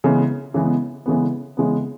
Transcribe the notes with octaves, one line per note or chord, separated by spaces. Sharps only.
C#3 E3 G#3 B3
C#3 E3 G#3 B3
C#3 E3 G#3 B3
C#3 E3 G#3 B3